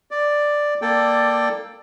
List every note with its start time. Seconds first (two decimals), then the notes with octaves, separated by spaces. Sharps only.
0.11 D5
0.82 A#3 A4 D5 G5